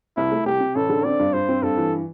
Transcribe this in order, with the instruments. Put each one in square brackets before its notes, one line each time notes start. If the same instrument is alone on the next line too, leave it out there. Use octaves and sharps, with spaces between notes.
[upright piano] C2 [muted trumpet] E4
[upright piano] A3
[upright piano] C2 [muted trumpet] G4
[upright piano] C3
[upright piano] A1 [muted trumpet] A4
[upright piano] D3
[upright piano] C4 [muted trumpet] D5
[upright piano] G2
[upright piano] G2 [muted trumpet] C5
[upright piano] C4
[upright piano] G2 [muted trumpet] A4
[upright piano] E3